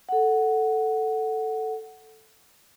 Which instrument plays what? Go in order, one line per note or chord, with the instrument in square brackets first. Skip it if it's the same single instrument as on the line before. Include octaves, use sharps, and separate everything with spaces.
[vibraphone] A4 F#5